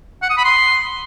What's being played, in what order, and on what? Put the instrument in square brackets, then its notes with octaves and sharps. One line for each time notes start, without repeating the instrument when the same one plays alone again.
[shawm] F#5
D#6
B5
C6